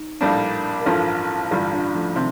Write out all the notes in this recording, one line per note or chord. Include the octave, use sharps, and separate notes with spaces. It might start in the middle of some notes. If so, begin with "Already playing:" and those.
Already playing: D#4
A#1 A2 G3 A#3 D4
A#4
A1 G2 F3 F4 A4
A1 G2 D3 G3 F4 A4
D4 F4
F3 A3
C3 D#3